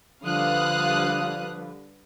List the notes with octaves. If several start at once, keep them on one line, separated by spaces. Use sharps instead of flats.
D3 F3 G3 B4 F5 D#6 F#6